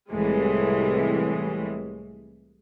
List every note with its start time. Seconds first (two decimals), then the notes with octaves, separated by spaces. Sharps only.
0.10 C2 A2 E3 G#3